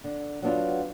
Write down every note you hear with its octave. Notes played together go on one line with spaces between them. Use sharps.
D3
F#3 B3 D4 F4